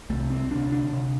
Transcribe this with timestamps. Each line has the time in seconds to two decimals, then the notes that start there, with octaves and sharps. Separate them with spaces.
0.10 C2 C3 A3
0.30 C4
0.51 D2 C3 D4
0.72 D4
0.93 C3